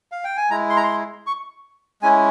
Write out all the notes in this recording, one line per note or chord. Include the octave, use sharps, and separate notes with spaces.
F5
G5
G#5
G#3 E4 A#5
C6
A#5
C6
C#6
G#3 C#4 E4 G#5